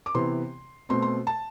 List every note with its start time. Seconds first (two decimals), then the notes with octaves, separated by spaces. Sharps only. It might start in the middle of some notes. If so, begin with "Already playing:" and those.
0.06 D6
0.14 C3 E3 B3 C6
0.89 B2 A3 C4 C6
1.02 C6
1.27 A5